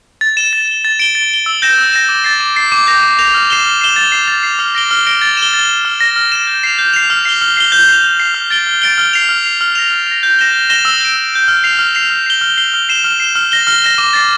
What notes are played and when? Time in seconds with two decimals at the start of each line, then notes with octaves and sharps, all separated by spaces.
0.21 A6
0.37 E7 G7
0.53 A6
0.68 E7 G7
0.85 A6
1.00 D7 G7
1.15 A6
1.31 D7 G7
1.46 E6
1.62 G6 A#6 E7
1.78 E6
1.93 G6 A#6 E7
2.09 D6
2.24 A6 C7
2.40 D6
2.56 A6 C7
2.72 D6
2.87 G6 A#6 F7
3.03 D6
3.19 G6 A#6 F7
3.34 F6
3.50 C7 E7 G7
3.66 F6
3.81 C7 E7 G7
3.96 A6
4.12 C7 F7
4.28 A6
4.43 C7 F7
4.59 F6
4.75 A#6 D7 G7
4.91 F6
5.06 A#6 D7 G7
5.22 A6
5.37 E7
5.42 G7
5.54 A6
5.69 E7 G7
5.85 F6
6.01 A#6 E7 G7
6.16 F6
6.32 A#6 E7 G7
6.47 G6
6.63 C7 F7
6.78 G6
6.94 C7 F7
7.10 F6
7.25 C7 G7
7.41 F6
7.57 C7 G7
7.72 G6
7.89 C7 F7
8.04 G6
8.19 C7 F7
8.34 F6
8.50 A6 D7 G7
8.67 F6
8.82 A6 D7 G7
8.98 F6
9.13 C7 F7
9.29 F6
9.44 C7 F7
9.61 F6
9.75 A#6 F7
9.91 F6
10.07 A#6 F7
10.23 G6
10.39 A#6 E7 G7
10.53 G6
10.70 A#6 E7 G7
10.85 E6
11.00 G6 D7
11.17 E6
11.32 G6 D7
11.48 F6
11.64 C7 F7
11.79 F6
11.95 C7 F7
12.10 F6
12.26 C7 G7
12.41 F6
12.57 C7 G7
12.74 F6
12.89 C7 E7 G7
13.04 F6
13.20 C7 E7 G7
13.36 F6
13.52 A#6 E7 G7
13.67 F6
13.82 A#6 E7 G7
13.98 D6
14.13 A6 C7